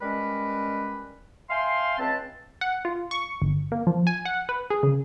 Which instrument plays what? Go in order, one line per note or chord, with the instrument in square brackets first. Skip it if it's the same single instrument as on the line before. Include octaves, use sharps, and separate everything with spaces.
[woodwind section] G3 G#3 C#4 A#4 B4
E5 F5 G5 G#5 C6
C#2 C4 B4 A5
[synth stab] F#5
F4
C#6
G1
A#3
F3
G#5
F#5
B4
G#4
C#3